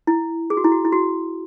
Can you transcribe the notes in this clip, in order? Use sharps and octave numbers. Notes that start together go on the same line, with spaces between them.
E4
G#4
F#4
E4
F#4
E4
F#4